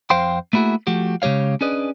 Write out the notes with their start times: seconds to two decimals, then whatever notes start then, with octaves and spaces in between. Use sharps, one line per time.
0.10 F2 C4 C5 F5 G5 C6
0.53 A3 A#3 E4 F#4 G#4
0.87 F3 A3 F#4 G4
1.22 C#3 G#3 G4 C#5 F5
1.61 C#4 D4 G#4 B4 D5 D#5